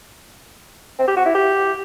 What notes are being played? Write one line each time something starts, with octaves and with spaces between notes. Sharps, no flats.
C4
G4
F#4
E4
G4